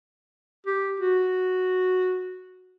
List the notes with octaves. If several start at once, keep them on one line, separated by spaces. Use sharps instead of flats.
G4
F#4